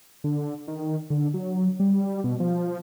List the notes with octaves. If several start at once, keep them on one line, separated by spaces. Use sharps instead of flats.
D3
D#3
D3
F#3
G3
B2
F3